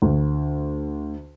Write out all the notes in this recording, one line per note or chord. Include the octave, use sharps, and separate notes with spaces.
D2